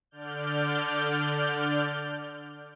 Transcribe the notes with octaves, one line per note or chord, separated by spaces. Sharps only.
D3 D5 F6 G6